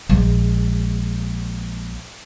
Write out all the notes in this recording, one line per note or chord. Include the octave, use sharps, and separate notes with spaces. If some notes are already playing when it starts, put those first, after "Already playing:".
A#1 G#3